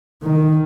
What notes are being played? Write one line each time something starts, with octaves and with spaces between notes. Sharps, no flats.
D#3